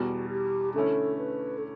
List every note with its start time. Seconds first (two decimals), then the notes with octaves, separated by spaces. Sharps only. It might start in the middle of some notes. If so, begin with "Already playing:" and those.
Already playing: E2 B2 G3 F#4
0.30 G4
0.74 D3 A3 C#4 E4 A4
1.18 B4
1.58 A4